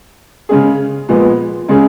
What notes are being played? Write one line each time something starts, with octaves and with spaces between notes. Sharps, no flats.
C#3 G#3 C#4 G#4
A#2 F3 G#3 B3
C#3 G#3 C#4 G#4